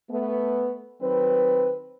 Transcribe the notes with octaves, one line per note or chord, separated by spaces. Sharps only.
A3 B3
D#3 F#3 C4 B4